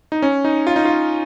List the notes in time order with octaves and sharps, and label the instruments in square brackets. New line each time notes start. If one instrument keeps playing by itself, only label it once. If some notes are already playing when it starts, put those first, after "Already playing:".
[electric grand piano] D#4
C#4
D#4
F4
D#4
F4